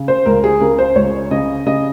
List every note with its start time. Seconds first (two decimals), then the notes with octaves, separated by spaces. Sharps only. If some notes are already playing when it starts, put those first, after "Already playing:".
Already playing: C#3
0.08 C5
0.26 C#2 A#4
0.44 G#4
0.60 C#3 A#4
0.78 C5
0.96 C#2 C#5
1.31 C#3 D#5
1.66 C#3 D#5